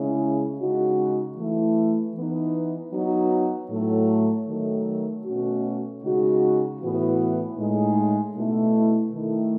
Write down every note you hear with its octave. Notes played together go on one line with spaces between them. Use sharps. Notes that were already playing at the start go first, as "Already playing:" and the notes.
Already playing: C#3 G#3 C#4 E4
C#3 G#3 D#4 F#4
E3 A3 E4
E3 B3 D#4
F#3 B3 D#4 F#4
A2 F#3 A3
D#3 F#3 A3
B2 A3 C#4 F#4
C#3 G#3 D#4 F#4
A2 E3 B3 F#4
A2 G#3 D#4
B2 A3 E4
D#3 A3 E4